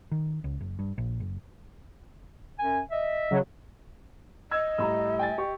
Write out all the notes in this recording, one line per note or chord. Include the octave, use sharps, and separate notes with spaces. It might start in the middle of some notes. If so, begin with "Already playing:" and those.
D#3
C#2
F#1
G2
A#1
F#1
F#2 G#5
D#5 E5
C#3 F#3
D#5 E6 G#6
A2 G3 A#5 B5 E6
G5 G#5 A6
G4 C#6